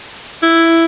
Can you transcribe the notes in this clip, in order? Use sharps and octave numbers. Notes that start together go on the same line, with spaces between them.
E4